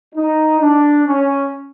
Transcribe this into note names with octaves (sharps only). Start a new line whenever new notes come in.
D#4
D4
C#4